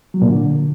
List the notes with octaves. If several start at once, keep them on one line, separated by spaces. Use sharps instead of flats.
F#3
A#2
D3